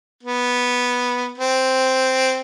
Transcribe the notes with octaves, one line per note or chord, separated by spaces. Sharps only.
B3
C4